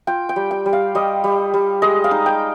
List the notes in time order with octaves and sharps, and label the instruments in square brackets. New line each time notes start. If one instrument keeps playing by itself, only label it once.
[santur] F4 G5
G5
G3
G5
G3
F5
G3 D#5
G3
G3
G#3 D#5
F5
D#4
G5